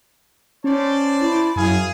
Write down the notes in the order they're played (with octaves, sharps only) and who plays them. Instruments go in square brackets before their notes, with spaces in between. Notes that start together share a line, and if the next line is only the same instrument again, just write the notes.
[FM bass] C#4 [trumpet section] C5 D5 A5
[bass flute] E4
[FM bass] F#2 [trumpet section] G#4 F5 G#5